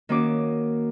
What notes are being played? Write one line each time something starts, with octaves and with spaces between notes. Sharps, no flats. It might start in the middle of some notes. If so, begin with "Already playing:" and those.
D#3 A#3 C#4 F#4 D6